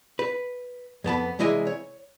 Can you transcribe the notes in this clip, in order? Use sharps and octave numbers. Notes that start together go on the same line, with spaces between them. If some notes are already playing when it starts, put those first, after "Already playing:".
B4
F2 B3 A5 B5
C2 E3 G#3 E4 D#5 G#5
C#5